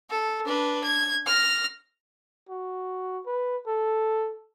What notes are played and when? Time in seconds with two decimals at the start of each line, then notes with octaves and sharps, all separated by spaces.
0.10 A4
0.46 D4 B4
0.84 G#6
1.26 F6 A#6
2.49 F#4
3.26 B4
3.67 A4